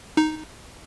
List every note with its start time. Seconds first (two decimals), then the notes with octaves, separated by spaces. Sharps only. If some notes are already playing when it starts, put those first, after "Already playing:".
0.17 D#4